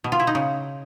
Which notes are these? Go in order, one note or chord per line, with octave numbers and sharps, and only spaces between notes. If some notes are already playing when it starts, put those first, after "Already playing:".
B2
F4
E4
D#4
C#3